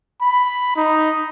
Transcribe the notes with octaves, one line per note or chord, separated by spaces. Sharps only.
B5
D#4